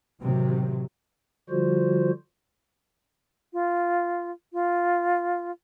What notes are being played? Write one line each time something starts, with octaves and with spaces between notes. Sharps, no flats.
A1 C3 D#3 F#3
D3 F3 G3 F4 F#4 C5
F4
F4